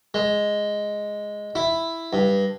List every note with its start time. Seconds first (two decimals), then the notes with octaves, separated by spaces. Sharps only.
0.14 G#3
1.55 E4
2.13 G2